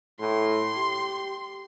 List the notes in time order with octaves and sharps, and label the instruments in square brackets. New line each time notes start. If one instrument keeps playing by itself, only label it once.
[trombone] A2 [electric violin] C6
[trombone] G4